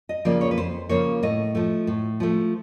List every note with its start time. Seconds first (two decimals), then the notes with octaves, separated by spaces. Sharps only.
0.09 D#5
0.25 C#3 F3 A#3 D5
0.41 C#5
0.51 B4
0.57 F2 C5
0.89 C#3 F3 A#3 C#5
1.23 A2 D#5
1.55 F3 A3
1.87 A2
2.20 F3 A3